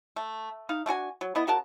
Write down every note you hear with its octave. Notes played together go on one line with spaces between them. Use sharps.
A3
D#4 F5
A3 D4 F#4 G#5
F#3
B3 E4 D#5
C#3 F#4 A#4 A5